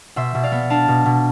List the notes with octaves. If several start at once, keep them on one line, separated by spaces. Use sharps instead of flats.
B2 C5 E5
B2
D5 F5
B3
D4 F5 A5
B2
B2